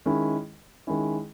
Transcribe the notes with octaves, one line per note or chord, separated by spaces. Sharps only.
D#3 G#3 C#4 E4
D#3 G#3 C#4 E4